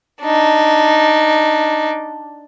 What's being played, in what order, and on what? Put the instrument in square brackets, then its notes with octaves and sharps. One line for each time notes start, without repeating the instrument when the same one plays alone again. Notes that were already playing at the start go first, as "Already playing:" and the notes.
[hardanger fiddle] D4 D#4